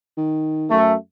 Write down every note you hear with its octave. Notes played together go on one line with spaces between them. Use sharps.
D#3
F#2 A3